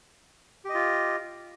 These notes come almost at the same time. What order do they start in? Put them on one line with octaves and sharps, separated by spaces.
G4 D#5 F4